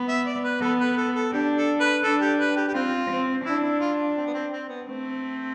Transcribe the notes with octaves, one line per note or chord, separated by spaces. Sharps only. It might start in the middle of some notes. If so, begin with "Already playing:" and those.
Already playing: B3
E5
D5
B4
B3 A4
B4
A4
A4
D4 G4
A4
B4
D4 A4
G4
B4
G4
G4
C4 F4
C4
D4 E4
E4
F4
C4
B3
C4
C4
B3
A3 C4